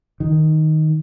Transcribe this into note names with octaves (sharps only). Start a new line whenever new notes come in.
D#3